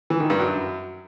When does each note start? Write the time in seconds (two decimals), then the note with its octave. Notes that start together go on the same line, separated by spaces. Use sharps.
0.10 E3
0.20 D#3
0.30 G2
0.40 F#2